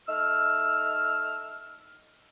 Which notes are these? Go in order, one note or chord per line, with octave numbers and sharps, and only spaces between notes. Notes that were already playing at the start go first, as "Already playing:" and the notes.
A3 D#4 E6 F6